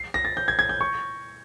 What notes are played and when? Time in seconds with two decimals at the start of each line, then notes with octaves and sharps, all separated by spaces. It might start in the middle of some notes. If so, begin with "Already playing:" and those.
Already playing: C7
0.14 A#6
0.25 A6
0.37 G6
0.48 G#6
0.59 G#6
0.69 G6
0.81 C#6